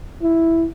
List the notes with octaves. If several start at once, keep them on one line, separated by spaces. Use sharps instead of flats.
E4